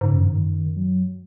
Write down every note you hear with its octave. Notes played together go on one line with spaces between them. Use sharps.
G#2 C#3
F#2
D#3
G#2
F#2 D#3
F#3